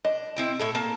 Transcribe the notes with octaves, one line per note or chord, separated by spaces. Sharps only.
D4 D#5
C4 E4 G5
A2 E4 A4
A#3 A5